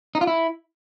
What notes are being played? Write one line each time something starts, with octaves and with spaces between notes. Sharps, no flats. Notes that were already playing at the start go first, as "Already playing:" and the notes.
D#4
F4
E4